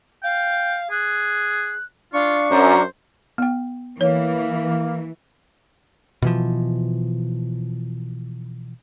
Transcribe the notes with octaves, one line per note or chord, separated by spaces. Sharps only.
F5 G5
G#4 F#6
D4 F4 F5 C#6
F#2 C5 A#5
B3 G5
E3 A#3 C#5
B2 E3 F3